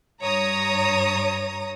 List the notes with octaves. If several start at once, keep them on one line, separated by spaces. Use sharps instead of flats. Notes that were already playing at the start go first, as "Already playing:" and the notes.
G2 C#5 A#5 D#6